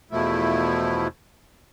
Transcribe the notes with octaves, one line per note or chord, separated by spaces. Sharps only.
E2 B2 F3 A3 E4